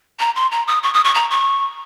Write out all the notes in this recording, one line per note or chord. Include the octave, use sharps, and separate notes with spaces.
A#5
C6
A#5
D#6
C#6
D#6
C#6
A#5
C#6